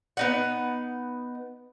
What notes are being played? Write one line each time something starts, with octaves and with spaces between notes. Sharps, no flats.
B3 D#4 F#5